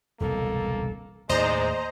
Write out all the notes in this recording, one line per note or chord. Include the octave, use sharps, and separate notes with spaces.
E1 C2 C#3 A#3 A4
D#2 A2 D#3 G#3 C5 D5 D#5 A#5